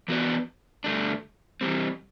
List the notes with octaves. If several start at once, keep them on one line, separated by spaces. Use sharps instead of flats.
E3 B3 F#4 B4 D5
G2 D3 A3 D4
E3 G3 C4